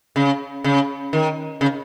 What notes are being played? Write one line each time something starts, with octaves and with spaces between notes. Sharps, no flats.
C#3
C#3
D#3
C#3